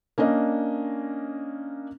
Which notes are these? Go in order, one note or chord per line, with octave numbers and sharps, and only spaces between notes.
A#3 C#4 D4 D#5